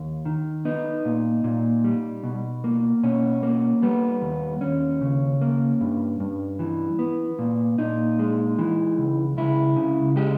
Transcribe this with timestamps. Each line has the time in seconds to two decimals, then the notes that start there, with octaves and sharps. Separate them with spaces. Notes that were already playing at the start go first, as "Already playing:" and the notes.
Already playing: D#2
0.25 D#3
0.65 B3 D#4
1.05 A#2
1.44 A#2
1.84 G3
2.23 B2
2.64 A#3
3.03 B2 C#4
3.43 A#3
3.82 G3 B3
4.21 D#2
4.61 D#2 C#4
5.01 C#3
5.42 A#3
5.81 G2
6.20 G2
6.59 E3
6.99 B3
7.39 A#2
7.78 A#2 D#4
8.19 G#3
8.59 E3
8.98 C#2
9.37 C#2 E4
9.76 C#3
10.16 G#3 G4